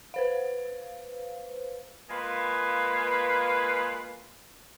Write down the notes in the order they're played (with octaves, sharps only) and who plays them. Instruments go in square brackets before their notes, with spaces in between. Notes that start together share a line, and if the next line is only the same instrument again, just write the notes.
[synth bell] B4 C5 F5
[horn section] G#3 A#3 F4 B4